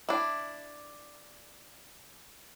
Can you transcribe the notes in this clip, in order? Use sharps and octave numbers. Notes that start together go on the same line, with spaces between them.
D4 E4